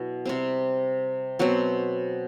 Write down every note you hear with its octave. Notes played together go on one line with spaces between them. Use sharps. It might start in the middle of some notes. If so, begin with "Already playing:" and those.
Already playing: B2 F#3 E4
C3 G3 C4
B2 F#3 C4